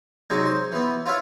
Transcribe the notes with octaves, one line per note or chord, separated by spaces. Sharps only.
C3 F#3 G#3 D#4
C5
E3 B3
F4 C#5 E5 F5